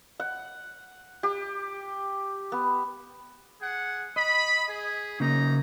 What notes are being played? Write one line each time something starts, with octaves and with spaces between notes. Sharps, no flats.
F#5
G4
B3
G#4 F#5
D#5 B5
G#4
C#3 A#3 D#4 A#5